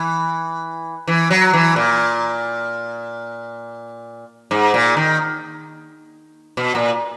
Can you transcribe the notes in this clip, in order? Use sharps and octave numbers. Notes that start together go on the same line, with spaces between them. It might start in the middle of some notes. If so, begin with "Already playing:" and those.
Already playing: E3
E3
F#3
E3
A#2
G#2
A#2
D#3
B2
A#2